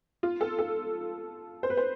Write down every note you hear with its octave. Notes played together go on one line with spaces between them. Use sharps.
F4
A4
A4
C5
B4
C5